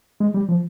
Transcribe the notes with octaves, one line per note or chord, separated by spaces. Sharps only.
G#3
G3
F3